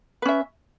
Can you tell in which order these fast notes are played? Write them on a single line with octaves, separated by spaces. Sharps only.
B4 C#4 E5